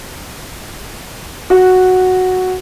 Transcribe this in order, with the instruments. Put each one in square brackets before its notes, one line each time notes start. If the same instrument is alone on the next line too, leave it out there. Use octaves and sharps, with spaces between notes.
[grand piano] F#4